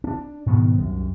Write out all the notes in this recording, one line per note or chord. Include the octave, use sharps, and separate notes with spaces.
C#4 D4
G#2 B2 D#3 B3
C2 F#2